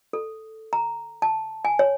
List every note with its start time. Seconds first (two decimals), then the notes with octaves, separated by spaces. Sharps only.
0.13 A4
0.73 A#5
1.22 A5
1.65 G#5
1.79 C#5